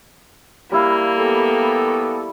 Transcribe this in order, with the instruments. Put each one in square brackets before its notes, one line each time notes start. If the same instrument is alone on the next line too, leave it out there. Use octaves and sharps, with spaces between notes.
[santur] G3 E4 F5 [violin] A#3
[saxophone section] B3 G4 A4
[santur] C#6